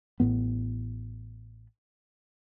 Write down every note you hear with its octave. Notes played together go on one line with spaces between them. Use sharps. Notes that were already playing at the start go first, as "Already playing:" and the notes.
A1 A2 C3 B3